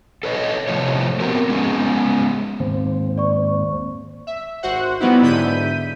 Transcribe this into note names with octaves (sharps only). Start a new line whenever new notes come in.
A4 B4 C#5 D#5
A2 C3 F3 A3 C#5
B3 C4 F#4 G4 A#4
G#3 B3 C#4 G#4
D#2 G#2 C4
D5 C#6
E5
G#1 F#4 C5 F#5
F#3 G3 B3 D#4 E4
G#2 D3 E4 G6 B6 D#7